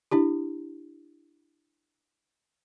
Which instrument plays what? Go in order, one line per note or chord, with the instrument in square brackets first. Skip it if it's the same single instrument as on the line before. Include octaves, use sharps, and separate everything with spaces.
[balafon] D4 E4 G4